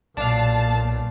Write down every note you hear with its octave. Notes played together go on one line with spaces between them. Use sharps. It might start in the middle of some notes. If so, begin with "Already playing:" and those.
B1 A#2 D4 F5 A5